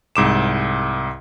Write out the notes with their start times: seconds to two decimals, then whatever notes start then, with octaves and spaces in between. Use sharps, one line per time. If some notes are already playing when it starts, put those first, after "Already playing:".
0.16 C2 G#2 D6 E7